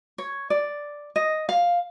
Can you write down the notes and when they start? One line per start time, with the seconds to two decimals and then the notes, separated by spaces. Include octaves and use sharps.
0.18 C#5
0.50 D5
1.16 D#5
1.49 F5